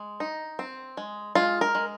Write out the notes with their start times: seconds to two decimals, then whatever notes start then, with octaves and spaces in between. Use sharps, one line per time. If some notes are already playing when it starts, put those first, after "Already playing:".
Already playing: G#3
0.20 D#4
0.59 C4
0.97 G#3
1.35 G#3 F4
1.61 A#4
1.75 G#3